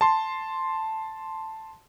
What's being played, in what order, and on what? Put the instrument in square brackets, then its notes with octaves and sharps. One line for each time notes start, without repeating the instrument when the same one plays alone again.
[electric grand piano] A5 C6